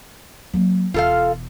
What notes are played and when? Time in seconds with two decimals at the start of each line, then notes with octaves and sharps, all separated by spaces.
0.53 F#3 A#3
0.94 E1 F4 A4 F5